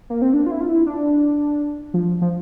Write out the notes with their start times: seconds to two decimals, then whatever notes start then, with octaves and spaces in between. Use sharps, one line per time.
0.10 A#3
0.22 C4
0.34 D4
0.46 F4
0.51 E4
0.61 F4
0.69 E4
0.86 D4
1.94 F3
2.21 F3